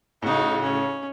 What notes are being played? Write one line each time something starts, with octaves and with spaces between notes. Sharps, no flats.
A2 C#3 D#4 F#4
C#4